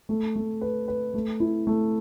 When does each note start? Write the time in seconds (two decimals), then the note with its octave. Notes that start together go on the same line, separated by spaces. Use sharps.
0.09 A3
0.35 A3
0.61 B4
0.88 B4
1.14 A3
1.40 E4
1.67 A3